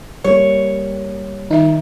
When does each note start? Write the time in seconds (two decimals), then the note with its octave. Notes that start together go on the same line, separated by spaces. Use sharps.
0.24 G3 A#3 C#5
1.51 D#3 D#4 E5